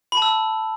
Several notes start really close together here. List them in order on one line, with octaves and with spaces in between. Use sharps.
B5 A5 E6